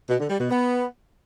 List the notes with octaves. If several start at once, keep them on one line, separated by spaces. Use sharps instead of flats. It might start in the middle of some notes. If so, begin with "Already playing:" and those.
B2
D3
G3
B2
B3